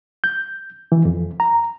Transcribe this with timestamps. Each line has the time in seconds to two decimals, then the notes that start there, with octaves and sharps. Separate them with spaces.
0.24 G6
0.92 E3
1.05 F2
1.40 A#5